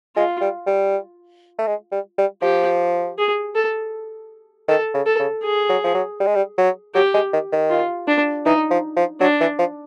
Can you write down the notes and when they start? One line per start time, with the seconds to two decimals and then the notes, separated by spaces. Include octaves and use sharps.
0.16 G#3 F4
0.41 G3
0.66 G3
1.58 A3
1.67 G#3
1.92 G3
2.18 G3
2.42 F3 G4
3.18 G#4
3.55 A4
4.68 D#3 A4
4.94 C#3
5.06 A4
5.19 C#3
5.44 G#4
5.69 F#3
5.84 F3
5.94 F#3
6.20 G3
6.27 G#3
6.35 G3
6.58 F#3
6.95 F#3 G4
7.14 G#3
7.33 D#3
7.52 D#3
7.70 F4
8.08 D4
8.46 E3 D#4
8.70 F3
8.96 F3
9.20 F#3 D4
9.40 E3
9.59 F3